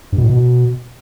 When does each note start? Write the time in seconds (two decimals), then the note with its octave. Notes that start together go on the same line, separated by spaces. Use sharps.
0.12 G2
0.18 B2
0.24 A2
0.30 B2